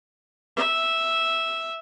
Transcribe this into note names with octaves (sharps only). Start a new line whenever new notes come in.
E5